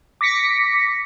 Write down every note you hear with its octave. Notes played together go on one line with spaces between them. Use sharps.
D6 A#6 B6 C#7